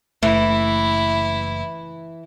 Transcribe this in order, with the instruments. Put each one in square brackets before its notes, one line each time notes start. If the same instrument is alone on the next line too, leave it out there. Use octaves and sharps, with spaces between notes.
[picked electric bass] F#1 A3 [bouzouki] E3 [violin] E4